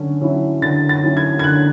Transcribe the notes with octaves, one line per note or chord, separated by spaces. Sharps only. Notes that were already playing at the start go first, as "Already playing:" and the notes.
Already playing: D3 F#3 C#4
F#3 C#4 E4
D3 A6
A6
F#3 C#4 E4
G#6
G#6
D3 F#6